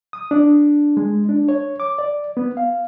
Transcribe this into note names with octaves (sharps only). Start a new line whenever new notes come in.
D#6
D4
G#3
D4
C#5
D6
D5
B3
F5